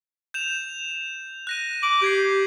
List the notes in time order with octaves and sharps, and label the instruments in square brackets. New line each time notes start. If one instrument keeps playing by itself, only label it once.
[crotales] G6 E7 F7
F#6 A#6 D#7
[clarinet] D6 [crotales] F#7
[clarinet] G4 [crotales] G6 G#6 C7